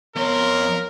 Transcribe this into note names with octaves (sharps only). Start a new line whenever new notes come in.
F2 B3 A#4 C#5 C6